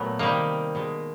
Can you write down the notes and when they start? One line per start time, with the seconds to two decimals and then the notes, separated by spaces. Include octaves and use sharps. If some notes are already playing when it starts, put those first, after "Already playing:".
Already playing: A#2 F#3 A3 B3
0.19 C3 D#3 G3 A#3
0.75 B2 G#3